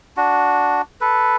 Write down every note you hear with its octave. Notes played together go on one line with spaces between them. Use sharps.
D4 F#4
A4 B4